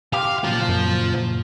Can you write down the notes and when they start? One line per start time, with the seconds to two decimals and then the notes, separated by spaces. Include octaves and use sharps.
0.13 F4 G4 F5
0.44 A#2 C#3 F3 F#3 F4
0.69 F#2